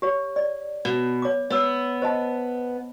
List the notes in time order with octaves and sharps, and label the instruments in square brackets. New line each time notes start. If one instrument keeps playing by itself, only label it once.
[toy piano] G4 C#5
D5
[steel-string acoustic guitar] B2
[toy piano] C#5 D6
[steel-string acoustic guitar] B3 [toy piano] C#5 E6
[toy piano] C5 D#5 A5